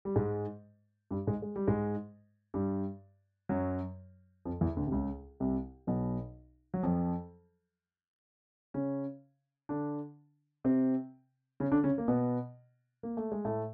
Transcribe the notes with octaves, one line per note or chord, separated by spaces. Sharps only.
G3
G#2 G#3
G2 G3
G#2 G#3
G#3
G3
G#2 G#3
G2 G3
F#2 F#3
F2 F3
E2 E3
D2 D3
C3
C#2 C#3
C2 C3
B1 B2
F#3
F2 F3
C#3 C#4
D3 D4
C3 C4
C#3 C#4
D3 D4
C#3 C#4
A#3
B2 B3
A#3
A3
G#3
A2 A3